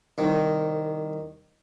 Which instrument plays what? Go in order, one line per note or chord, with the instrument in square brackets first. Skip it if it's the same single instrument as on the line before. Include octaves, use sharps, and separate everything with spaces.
[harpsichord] C2 D#3